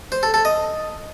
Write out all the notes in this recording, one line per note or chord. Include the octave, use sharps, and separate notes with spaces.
C5
A4
A4
D#5